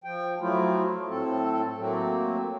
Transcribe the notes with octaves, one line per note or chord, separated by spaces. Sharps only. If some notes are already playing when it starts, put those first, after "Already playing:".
F3 G5
F3 F#3 A3 E4 F4
A2 C4 A4
F#3 A3 A#3 C4